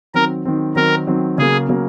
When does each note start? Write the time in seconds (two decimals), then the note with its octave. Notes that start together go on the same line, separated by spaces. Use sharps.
0.14 D#3 F#3 C4 A#4
0.45 D#3 F#3 C4
0.76 D#3 F#3 C4 A#4
1.07 D#3 F#3 C4
1.38 C#3 F#3 A#3 G#4
1.69 C#3 F#3 A#3